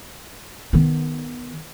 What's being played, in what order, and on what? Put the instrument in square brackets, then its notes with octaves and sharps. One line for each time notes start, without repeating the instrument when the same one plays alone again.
[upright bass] D#3 B3